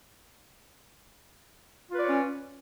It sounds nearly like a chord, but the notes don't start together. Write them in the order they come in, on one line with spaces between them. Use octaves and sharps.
F4 B4 D5 C#5 C#4